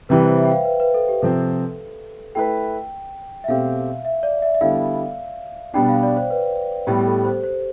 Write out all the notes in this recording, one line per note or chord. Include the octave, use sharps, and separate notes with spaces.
C3 E3 G3 B4
C5
E5
G5
F5
B4
B4
A4
G4
C3 F3 C4 A4
A3 E4 B4 G5
E5
B2 A3 C4 G4 F5
E5
D5
E5
E5
D3 G3 B3 E4 A4 F5
B2 G3 B3 D4 G5
F5
D5
C5
B4
A2 G3 B3 G4
G4
A4
C5
C5